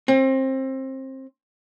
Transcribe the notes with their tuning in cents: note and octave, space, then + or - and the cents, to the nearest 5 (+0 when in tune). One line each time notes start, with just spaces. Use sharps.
C4 +25